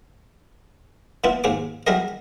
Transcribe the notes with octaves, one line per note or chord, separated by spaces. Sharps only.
A#2 B3 E4 F4
D#2 G#2 G#4 D6
F#3 G3 E4 G#4 A#4 D#5